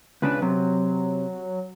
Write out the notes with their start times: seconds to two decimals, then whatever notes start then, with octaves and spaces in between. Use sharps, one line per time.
0.22 C#2 C#3 D4 B4
0.42 C3 F#3